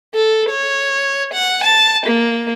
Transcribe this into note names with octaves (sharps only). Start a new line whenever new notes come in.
A4
C#5
F#5
A5
A#3